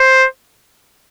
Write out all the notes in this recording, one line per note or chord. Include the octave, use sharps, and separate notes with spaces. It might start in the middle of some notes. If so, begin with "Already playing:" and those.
Already playing: C5